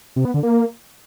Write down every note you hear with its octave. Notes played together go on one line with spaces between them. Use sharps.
C3
B3
D3
A#3